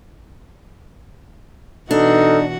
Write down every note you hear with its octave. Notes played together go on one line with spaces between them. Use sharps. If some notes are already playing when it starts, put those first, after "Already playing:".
B2 E3 D4 D#4 F#4 A4